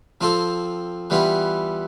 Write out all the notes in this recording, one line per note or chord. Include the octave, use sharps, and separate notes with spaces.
F3 C4 F4 A4 C5
E3 G3 B3 F4